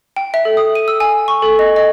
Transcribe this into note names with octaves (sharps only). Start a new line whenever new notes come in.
G5
E5
A4
D#6
D#7
E6
G#5
C#6
A4
D#5
D#5